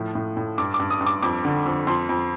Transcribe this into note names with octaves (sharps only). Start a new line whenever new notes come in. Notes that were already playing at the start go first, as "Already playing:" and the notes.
Already playing: A2 F3
A2
A2
G2 D6
D6
G2
D#6
G2
D6
F2 D6
D3
F2
F2 C6
F2